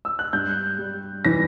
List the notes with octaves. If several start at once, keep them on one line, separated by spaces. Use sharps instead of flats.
E6
F#6
G2 G6
G3
E3 A#6